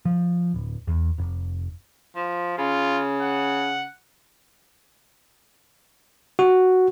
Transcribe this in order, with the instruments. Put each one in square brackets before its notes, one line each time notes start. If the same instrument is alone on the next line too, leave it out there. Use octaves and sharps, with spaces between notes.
[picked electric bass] F3
D1
E2
F1
[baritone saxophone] F3
[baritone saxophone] C#3 [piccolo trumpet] F4
[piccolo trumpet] F#5
[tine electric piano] F#4